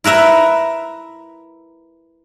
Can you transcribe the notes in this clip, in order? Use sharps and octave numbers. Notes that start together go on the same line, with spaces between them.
E4 A#4 B4 E5 A#5